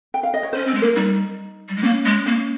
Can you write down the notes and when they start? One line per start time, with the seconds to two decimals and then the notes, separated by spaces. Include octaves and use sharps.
0.14 G5
0.23 F5
0.34 D#5
0.43 C#5
0.53 C#4 C5
0.67 C4
0.75 G#3
0.82 A#3 A#4
0.96 G3 D#4
1.69 G3
1.76 G#3
1.83 A#3 C#4
2.05 G#3
2.26 A#3 C#4